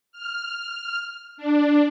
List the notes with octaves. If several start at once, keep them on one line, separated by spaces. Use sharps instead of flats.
F6
D4